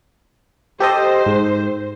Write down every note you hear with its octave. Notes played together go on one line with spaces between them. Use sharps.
G4 A4 C5 D#5
G#2